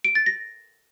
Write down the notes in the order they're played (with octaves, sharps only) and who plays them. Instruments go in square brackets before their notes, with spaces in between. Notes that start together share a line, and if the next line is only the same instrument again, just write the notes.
[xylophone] D7
A6
A#6